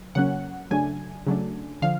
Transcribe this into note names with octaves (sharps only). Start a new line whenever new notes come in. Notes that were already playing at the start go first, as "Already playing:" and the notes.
Already playing: F#3
C#3 F#3 A#3 C#4 F#5
C#3 F#3 A3 D4 G#5
C#3 F#3 A3 D4
D3 F3 F5